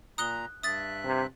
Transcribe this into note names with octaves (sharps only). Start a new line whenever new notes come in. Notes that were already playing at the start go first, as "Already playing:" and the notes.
A#2 A#5 D#6 F#6 G7
G2 E5 D#6 F#6 A6
C3